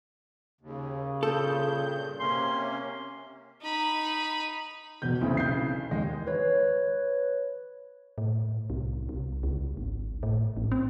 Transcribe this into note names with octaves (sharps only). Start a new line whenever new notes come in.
D#2 C#3
G2 A#2 A4 G6
C3 A#3 C#4 C6
D#4 B5
E1 B2 G6
B1 C#3 C4 E4
G6 C7
D#2 G#3
B4 C#5
A2
C2
C2
C#2
G#1
A2
A1
C4